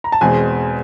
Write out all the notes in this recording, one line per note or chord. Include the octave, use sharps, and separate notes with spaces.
A#5
A5
E2 B2 G#3 C4 G#5